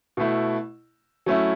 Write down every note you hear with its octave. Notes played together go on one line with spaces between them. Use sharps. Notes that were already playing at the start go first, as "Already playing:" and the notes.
B2 A3 E4
F#3 A3 C#4 E4